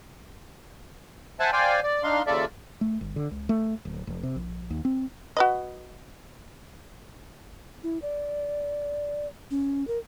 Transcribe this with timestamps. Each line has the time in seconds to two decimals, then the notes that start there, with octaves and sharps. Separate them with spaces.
1.40 C5 E5 F#5 G#5 A5
1.52 C5 D5 F5 G5 G#5
1.83 D5
2.03 D4 D#4 F5 C6
2.27 D#2 C#3 F4 A4 D5 E5
2.81 A3
3.01 G1
3.16 D3
3.31 C#2
3.49 A3
3.85 D1
4.07 F1
4.23 C3
4.36 A#1
4.70 D#2
4.85 C4
5.37 F#4 B4 D#5
7.83 E4
8.02 D5
9.51 C#4
9.87 A#4